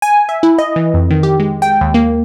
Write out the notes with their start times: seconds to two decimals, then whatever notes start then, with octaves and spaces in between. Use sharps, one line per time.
0.02 G#5
0.29 E5
0.43 E4
0.58 D#5
0.76 E3
0.94 F2
1.11 D#3
1.23 G4
1.40 G#3
1.62 G5
1.81 D#2
1.94 A#3